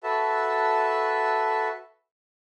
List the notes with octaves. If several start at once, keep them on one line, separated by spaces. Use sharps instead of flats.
F#4 A4 B4 E5 A5